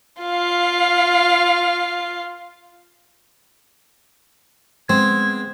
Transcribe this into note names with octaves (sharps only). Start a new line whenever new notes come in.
F4 F5
G#3 B3 C4 G#6